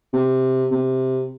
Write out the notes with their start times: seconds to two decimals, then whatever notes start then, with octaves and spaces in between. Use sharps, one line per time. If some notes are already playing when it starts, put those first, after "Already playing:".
0.13 C3
0.71 C3